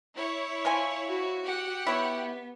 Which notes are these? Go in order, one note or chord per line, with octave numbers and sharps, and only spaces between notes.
E4 C#5
F3 C5 G#5
F#4
G4 F#5
B3 E4 C#5